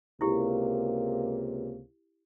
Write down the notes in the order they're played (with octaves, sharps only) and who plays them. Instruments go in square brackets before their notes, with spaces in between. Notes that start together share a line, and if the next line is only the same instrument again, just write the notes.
[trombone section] C#2 C3 A#3 [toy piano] E4 G4